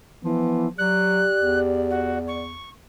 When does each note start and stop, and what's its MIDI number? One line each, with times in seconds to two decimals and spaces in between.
0.24 0.69 52
0.24 0.70 53
0.24 0.67 59
0.78 1.27 54
0.78 2.19 67
0.78 2.44 74
0.78 1.59 90
1.39 2.59 40
1.90 2.18 66
2.27 2.69 85